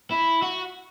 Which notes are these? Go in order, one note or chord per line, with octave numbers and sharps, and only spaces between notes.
E4
F#4